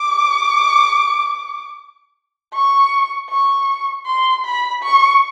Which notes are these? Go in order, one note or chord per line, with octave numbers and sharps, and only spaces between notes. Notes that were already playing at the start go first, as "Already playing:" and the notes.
Already playing: D6
C#6
C#6
C6
B5
C#6